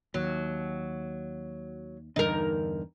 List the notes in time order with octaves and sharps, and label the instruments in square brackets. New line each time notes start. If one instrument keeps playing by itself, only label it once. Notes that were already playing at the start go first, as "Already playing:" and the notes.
[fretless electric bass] D#2 [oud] F#3
[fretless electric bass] E2 G2 D3 [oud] D#4 A#4